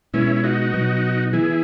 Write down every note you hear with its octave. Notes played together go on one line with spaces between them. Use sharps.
B2 G#3 B3 C#4 E4
E4
D#4 F#4
B2 F#3 B3
E3 B3 E4 G#4